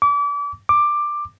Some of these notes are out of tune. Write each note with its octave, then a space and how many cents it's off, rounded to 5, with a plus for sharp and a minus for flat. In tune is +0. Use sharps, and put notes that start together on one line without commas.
D6 -35
D6 +10